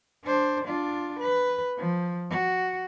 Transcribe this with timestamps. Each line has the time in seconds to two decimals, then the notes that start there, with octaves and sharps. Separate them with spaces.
0.25 D4 C5
0.64 D4 F4
1.20 B4
1.78 F3
2.30 F#4